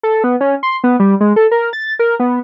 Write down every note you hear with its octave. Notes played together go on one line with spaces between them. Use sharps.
A4
B3
C#4
C6
B3
G3
G#3
A4
A#4
A6
A#4
B3